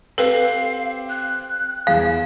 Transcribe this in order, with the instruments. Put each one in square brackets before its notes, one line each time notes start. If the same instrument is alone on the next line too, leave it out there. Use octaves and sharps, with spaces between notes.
[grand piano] C4 G4 [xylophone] A4 B4 [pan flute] F5
[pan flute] F#6
[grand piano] E2 G#4 [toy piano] F5